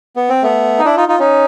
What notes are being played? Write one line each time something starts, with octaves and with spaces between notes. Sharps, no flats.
B3
C4
A3 B3
D#4
D4 E4
D#4 F4
D#4 F4
C#4 D#4